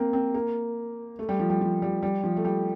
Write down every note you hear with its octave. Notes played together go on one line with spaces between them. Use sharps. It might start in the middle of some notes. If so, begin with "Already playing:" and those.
Already playing: A#3 C4
C4
A#3
A3
G3
F3
G3
F3
G3
G3
F3
A3
G3